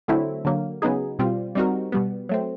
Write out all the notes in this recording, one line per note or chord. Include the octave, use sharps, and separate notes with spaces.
D3 F#3 A3 C4 E4
D3 F#3 A#3
C#3 F#3 B3 D#4 G#4
B2 G3 C4 F4
G3 C4 D#4 F#4 A#4
B2 G3 B3
F#3 A3 C4